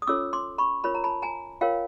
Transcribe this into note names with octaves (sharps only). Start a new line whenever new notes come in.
D#6
C#4 F4 A4 C#5 D6 E6
C6 D6
B5 C#6
F4 A#4 C#5 B5
A#5
A5 B5
G#5 A#5
F4 A#4 C#5 F5 G5